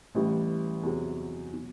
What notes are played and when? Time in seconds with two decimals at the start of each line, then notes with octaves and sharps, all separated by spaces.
0.15 A1 A2 E3 G3
0.83 E2 C3 F#3
1.53 B2 F#3